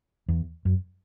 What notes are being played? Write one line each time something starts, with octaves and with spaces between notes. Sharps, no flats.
E2
F#2